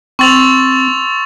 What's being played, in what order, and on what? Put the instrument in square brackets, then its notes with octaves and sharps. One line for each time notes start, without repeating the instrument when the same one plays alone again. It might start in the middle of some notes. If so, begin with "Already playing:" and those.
[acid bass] C4 [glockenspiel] C6 E6 F#7 [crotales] C#6 A6 F7